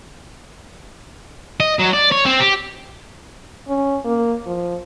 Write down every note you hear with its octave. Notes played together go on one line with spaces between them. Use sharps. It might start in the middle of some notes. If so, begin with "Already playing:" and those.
D#5
F#3
D5
C#5
C4
G4
C#4
A#3
F3